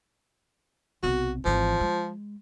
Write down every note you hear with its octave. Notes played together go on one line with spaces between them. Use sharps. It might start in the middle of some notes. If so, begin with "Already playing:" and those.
B1 C3 F#4
G#1 E3 F3
G#3